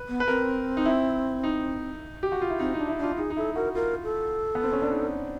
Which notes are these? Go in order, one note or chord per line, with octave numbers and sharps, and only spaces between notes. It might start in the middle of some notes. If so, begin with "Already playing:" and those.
Already playing: B4
B3
B4
C4 A#4
D#4
E4
D#4
G4
F#4
F4
E4
C4 D#4
D4 D#4
E4
D4 F4
D#4 G#4
D#4
E4 A4
F#4 A#4
F4 A#4
A4
B3
C4
C#4
D4
D#4